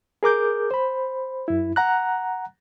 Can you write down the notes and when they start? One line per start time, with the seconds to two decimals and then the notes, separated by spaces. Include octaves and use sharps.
0.23 G#4 A#4 D6 G6
0.71 C5 B5
1.48 F#2 E4
1.76 F#5 A#5 F#6